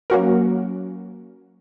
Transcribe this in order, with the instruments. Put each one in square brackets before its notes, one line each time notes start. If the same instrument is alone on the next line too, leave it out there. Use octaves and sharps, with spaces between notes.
[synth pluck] F#3 A#3 C#4 F#4 A#4